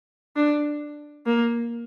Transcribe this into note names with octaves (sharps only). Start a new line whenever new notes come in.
D4
A#3